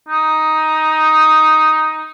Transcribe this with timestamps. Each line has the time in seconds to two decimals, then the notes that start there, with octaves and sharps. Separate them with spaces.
0.08 D#4